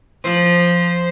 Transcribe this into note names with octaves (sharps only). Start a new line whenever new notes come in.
F3 C5